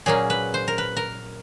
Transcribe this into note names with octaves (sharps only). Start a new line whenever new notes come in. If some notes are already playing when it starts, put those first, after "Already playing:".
A#2 F#3 A#3 C#4 G#4
B4
C5
A#4
B4
A#4